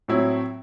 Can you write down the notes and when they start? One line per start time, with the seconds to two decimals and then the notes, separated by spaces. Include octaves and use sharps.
0.08 A2 F#3 C4 E4